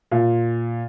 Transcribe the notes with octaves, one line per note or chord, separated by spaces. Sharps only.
A#2